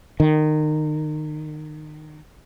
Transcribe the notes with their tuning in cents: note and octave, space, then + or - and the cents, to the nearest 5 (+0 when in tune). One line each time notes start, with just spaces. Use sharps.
D#3 -25